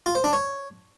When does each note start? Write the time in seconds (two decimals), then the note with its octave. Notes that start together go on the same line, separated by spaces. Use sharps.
0.06 F4
0.15 C5
0.24 D4
0.33 C#5